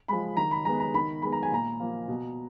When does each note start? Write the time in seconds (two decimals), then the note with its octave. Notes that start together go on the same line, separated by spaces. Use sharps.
0.08 F3 G#3 B5
0.37 D#3 A#5
0.51 B5
0.65 G#3 B3 A#5
0.80 A#5
0.94 D#3 B5
1.22 G#3 B3 B5
1.32 A#5
1.43 G#5
1.51 A#2 A#5
1.80 F3 A#3
2.08 B2